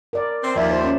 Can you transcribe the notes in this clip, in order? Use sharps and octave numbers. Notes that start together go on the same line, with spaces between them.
A#4 D5
C4
D#2 F3 D5 E5
C5
C#4